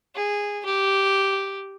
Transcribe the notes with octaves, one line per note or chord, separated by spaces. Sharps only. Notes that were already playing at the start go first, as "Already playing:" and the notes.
G#4
G4